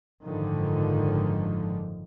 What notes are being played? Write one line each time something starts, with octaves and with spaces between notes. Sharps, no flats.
F#1 G#2 D3 D#3 F3